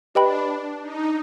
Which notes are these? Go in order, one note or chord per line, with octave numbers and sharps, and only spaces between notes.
D4 G4 B4 D#5 G5 B5
D#4